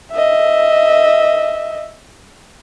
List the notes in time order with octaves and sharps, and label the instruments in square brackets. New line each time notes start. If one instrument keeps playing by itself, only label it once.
[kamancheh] D#5 E5